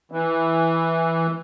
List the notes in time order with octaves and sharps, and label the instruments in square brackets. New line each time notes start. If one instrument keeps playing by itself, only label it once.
[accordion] E3